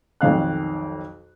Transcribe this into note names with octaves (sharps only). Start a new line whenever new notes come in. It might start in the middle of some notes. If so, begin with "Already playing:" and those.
B1 F2 D#3 F5 F#6